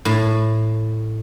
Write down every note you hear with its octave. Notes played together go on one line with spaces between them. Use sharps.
A2